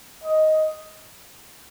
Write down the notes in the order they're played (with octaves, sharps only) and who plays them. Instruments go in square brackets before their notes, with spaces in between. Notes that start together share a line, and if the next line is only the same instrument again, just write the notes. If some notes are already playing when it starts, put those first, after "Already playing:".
[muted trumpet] D#5